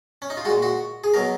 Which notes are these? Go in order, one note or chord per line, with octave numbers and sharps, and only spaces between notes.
C#4
D#4
F4
A#2 G#3 F#4
F#4
G#4
B2 F#3 A#4